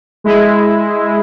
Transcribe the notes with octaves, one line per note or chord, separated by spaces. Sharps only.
G#3 E4